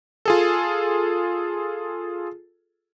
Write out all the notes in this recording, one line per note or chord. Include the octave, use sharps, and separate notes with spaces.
F4 G#4 A4